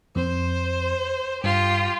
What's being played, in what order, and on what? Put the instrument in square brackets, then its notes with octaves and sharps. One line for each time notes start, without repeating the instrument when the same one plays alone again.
[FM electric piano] F2 C4 [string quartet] C5
[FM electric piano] G2 [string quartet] F4 G4